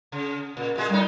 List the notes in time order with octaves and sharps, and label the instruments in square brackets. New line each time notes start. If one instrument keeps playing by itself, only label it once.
[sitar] C#3
A#2
A#2 G#3 G#4
[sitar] A2 D#4 [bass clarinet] G3